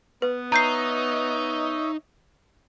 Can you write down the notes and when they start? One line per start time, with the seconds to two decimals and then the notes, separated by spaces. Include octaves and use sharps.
0.22 B3 B4
0.52 D#4 C#5 D#5 E5 A#5 G6 C7